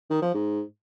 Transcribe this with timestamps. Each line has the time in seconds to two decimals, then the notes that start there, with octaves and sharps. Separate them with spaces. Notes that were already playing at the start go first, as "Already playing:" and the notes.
0.10 D#3
0.22 F3
0.34 G#2